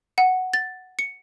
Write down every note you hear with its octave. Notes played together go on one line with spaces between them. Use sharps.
F#5
A6
C#7